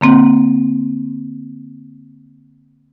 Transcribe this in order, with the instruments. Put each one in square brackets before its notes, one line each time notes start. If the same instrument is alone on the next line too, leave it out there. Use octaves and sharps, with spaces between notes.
[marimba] D3 A#3 C4